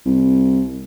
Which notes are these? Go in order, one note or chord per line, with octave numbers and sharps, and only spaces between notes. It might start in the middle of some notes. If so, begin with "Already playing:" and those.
C2